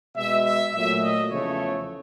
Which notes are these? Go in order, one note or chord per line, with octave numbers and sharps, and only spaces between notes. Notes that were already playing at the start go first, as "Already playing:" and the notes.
B2 G#3 E5
E5
A#2 F#3 A3 E5
D#5
E2 C#3 F3 A3 C#5